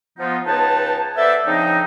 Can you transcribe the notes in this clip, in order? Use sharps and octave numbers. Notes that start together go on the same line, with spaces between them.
F3 B3 D#4 F4
C#2 D#4 B4 C#5 G5 A5
B3 A4 C5 D5 E5
C#3 F3 C4 D4 D#4